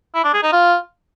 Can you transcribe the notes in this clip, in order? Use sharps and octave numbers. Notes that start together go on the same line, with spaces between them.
E4
D4
G#4
D#4
F4